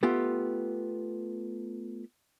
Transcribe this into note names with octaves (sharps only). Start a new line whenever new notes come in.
A3 B3 F4 G4